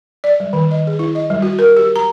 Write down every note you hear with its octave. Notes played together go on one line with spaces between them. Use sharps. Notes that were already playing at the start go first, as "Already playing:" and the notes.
D5
G3
D#3
D#5
G#4
E4
D#5
G3
F#4
A#4
G4
A#5